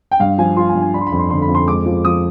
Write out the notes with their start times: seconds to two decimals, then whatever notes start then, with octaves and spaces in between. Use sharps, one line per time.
0.11 G5
0.20 G2 F5
0.38 F3 G#5
0.57 F4 C6
0.69 G#5
0.75 G2
0.82 G#5
0.94 D4 B5
1.01 C6
1.07 B5
1.12 F2
1.19 C6
1.30 D3 C6
1.42 B5
1.49 F2
1.55 C6
1.68 G#3 D6
1.86 F3
2.05 F3 D#6